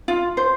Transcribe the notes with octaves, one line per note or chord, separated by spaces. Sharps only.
F4
C5